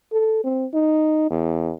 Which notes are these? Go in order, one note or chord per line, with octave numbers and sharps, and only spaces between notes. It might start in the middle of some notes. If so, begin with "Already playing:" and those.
A4
C4
D#4
E2